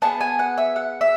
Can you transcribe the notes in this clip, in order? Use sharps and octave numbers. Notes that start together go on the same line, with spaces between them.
B3 D4 G#4 A5
G#5
F#5
E5
F#5
E5